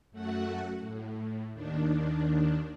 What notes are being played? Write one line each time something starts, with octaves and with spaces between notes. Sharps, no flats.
F#2 A3 F#4 F#5
A2
D#2 D#3 D4